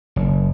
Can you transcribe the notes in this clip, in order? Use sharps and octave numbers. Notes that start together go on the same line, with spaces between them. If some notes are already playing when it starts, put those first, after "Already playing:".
F#1